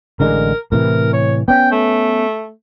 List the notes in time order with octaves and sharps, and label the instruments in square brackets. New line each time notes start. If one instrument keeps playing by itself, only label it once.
[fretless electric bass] A1 D3 G#3 [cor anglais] A#4
[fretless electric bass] A2 C3 E3 [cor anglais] A#4
[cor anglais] C#5
[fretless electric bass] B3 C#4 [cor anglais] G5
[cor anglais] A3